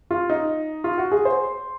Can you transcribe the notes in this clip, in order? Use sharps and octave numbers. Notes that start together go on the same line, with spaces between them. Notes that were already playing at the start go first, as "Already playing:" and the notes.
F4
D#4
F4
F#4
G#4
C5